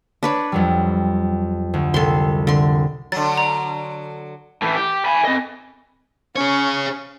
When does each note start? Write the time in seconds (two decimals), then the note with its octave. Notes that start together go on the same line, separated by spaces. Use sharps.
0.23 D4 B4 C#5
0.52 F2 F#3 G3
1.74 D2
1.94 C2 A4 C6
2.47 D3 C6
3.12 D3 F#3 A6
3.37 A#5
4.62 A2 E3
4.76 G4
5.05 G#5 B5
5.25 C4 D#5
6.36 C#4 G#4 C#5